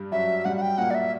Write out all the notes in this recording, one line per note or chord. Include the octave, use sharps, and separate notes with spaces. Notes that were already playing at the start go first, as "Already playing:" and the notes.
Already playing: G2 G3
F#2 F#3 E5
G2 G3 F#5
F#5
G5
A#2 A#3 F#5
D5
E5